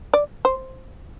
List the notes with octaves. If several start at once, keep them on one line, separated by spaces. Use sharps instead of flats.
D5
C5